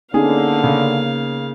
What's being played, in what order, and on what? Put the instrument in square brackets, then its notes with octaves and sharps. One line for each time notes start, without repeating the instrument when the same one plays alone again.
[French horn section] D3 [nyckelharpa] A#3 F5 [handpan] B3 C#4 D#4 [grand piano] G#4
[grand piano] C#3